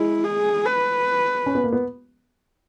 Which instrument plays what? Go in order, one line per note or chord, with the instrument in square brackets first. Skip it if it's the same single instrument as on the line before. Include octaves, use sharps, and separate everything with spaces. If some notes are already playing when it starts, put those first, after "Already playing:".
Already playing: [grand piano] G#3 [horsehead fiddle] E4
[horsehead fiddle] G#4
B4
[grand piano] C#4
B3
A#3
B3